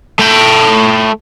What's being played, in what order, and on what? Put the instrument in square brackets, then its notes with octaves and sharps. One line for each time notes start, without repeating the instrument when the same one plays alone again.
[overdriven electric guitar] A3 G5